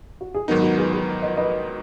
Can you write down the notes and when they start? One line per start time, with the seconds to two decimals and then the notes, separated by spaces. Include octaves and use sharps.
0.21 F#4
0.34 G#4
0.48 G#2 D#3 F#3 B3 D#4 F#4 A#4
0.58 B4
0.62 F#4 A#4
0.78 G#4 B4
0.93 G#4 B4
1.22 B4 D#5
1.37 B4 D#5